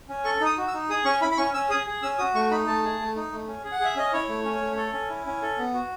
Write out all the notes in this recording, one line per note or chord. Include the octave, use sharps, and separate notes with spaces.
C#4
A4 C#6
D#4
D#6
F#4
E6
D#4
G#4 D#6
C#4 C#6
E4 B5
B5
C#4 C#6
C#4 E6
G#4 D#6
G#4
C#4 E6
F#4 D#6
A3 C#6
D#4 B5
A3 A5
G#4
A3
D#4
A3
C#4
G#4
F#5
G#4
E5
C#4 D#5
E4 C#5
A3
C#4
A3
A4
C#4
E4
C#4
A4
B3
F#4